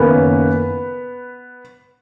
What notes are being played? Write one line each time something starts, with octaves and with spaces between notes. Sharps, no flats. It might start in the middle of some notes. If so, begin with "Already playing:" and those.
Already playing: F#1 F#2 D#3 A#3 B3 C#4 B4